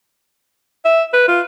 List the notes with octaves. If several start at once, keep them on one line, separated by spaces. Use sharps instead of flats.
E5
B4
F4